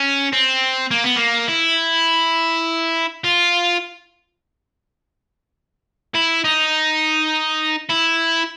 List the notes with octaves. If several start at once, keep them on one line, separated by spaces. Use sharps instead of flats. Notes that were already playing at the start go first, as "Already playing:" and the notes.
Already playing: C#4
C4
A#3
B3
A#3
E4
F4
E4
D#4
E4